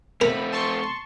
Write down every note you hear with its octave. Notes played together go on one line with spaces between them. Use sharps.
A3 C4 A#4 B5
A5 C6 C#6